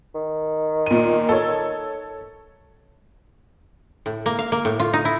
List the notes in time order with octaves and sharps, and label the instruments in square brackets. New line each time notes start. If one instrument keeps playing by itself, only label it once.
[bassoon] D#3
[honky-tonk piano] A#2 D#7
A4 C#5
[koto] A2
A#3
F5
A#3
A2
F4
D#4
E4